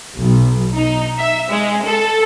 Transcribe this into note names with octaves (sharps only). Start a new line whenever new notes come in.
B1
D#4
E5
G#3
A4